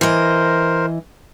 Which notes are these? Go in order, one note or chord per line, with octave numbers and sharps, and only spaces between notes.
E3 A#4 C5 D#5